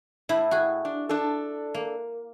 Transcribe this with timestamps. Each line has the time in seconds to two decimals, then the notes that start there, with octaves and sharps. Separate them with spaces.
0.29 A2 E4
0.51 F#4 G#4
0.85 D4
1.09 D4 A4
1.74 A#3